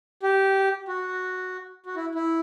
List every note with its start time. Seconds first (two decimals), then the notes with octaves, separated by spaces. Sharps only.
0.23 G4
0.88 F#4
1.86 F#4
1.96 E4
2.15 E4